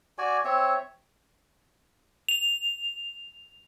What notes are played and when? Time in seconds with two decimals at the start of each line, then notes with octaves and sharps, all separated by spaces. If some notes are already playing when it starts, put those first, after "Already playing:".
0.18 F#4 D5 G#5
0.45 C4 C#5 E5
2.29 F7